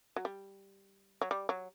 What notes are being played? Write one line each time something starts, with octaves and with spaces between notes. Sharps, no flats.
F#3
G3
F#3
G3
F#3